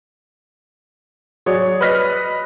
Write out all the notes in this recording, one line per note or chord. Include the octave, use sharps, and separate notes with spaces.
F#3 G#4 C#5 D5
B4 D5 D#5 F6 A#6 B6